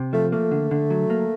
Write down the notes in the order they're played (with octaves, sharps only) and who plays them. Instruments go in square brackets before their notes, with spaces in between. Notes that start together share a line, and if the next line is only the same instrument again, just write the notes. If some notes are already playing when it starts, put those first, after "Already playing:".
Already playing: [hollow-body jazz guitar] C3
[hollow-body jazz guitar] F3 [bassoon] A3
[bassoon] A3 [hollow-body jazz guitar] A#3
[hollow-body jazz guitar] D3
D3
F#3
A#3